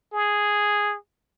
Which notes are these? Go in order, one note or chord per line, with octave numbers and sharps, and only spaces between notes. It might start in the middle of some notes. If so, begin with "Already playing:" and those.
G#4